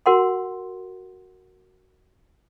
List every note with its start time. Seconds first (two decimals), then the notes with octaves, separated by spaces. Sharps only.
0.06 F#4 A#4 F#5 C6